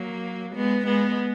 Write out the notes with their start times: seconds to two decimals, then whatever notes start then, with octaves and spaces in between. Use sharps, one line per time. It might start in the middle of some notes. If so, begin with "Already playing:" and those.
Already playing: F#3 A#3
0.55 G#3 B3
0.86 G#3 B3